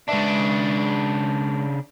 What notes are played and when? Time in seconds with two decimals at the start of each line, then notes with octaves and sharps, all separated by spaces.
0.09 C#3 G#3 D4 B4 E5